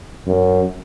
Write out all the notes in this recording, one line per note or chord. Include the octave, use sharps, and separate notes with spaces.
F#2